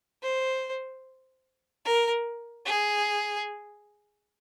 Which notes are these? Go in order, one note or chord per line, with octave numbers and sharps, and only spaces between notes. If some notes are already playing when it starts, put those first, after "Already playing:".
C5
A#4
G#4